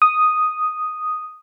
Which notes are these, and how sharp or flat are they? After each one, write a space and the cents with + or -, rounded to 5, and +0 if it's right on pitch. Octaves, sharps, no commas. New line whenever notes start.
D#6 +0